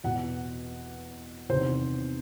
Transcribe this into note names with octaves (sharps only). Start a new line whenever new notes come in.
E2 B2 F#5
E2 C3 D#3 C5